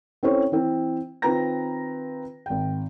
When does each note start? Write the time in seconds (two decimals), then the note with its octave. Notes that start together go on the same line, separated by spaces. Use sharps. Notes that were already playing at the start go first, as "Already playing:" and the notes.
0.23 C4 C#4 E4 A4 C5 C#5
0.52 E3 C4
1.22 D#3 C4 F4 B4 A#5 A#6
2.46 G#1 G5